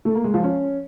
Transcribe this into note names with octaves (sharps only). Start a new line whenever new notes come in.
A3
A#3
G#3
F3
C#4